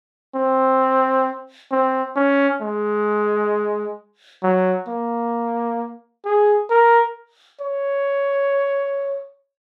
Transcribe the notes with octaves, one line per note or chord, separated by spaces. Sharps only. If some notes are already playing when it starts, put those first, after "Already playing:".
C4
C4
C#4
G#3
F#3
A#3
G#4
A#4
C#5